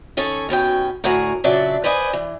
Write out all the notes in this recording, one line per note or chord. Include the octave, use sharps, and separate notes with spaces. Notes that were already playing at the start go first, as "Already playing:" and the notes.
D#3 C#4 A4 C#5
D#2 B2 C#4 G5
D2 A2 F#4 A#4 G#5
A#2 C#3 F#3 D4 D5 E5
B4 C5 D5 D#5 G#5
E3